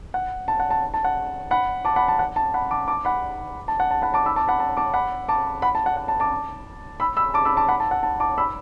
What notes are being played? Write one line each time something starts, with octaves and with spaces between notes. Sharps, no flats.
F#5
A5
F#5
A5
A5
F#5
F#5 B5
A5 D6
F#5 B5
A5
F#5
A5
F#5 B5
A5 D6
A5 D6
F#5 B5
A5
F#5
A5
F#5 B5
A5 D6
B5 E6
A5 D6
F#5 B5
A5
A5 D6
F#5 B5
A5 D6
F#5 B5
A5
F#5
F#5
A5
A5 D6
B5 E6
B5 E6
A5 D6
B5 E6
A5 D6
F#5 B5
A5
F#5
A5
A5 D6
B5 E6